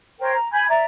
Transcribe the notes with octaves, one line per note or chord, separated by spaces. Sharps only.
A#4 C5 C#5 G5
A#5
G#5 B5 G6 G#6
D5 E5 A#5